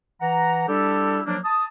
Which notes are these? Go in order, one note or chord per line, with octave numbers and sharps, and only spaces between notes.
E3 F#5 A#5
G3 D4 E4 G4 A4
F3 F#3 A#3 D4
A5 D#6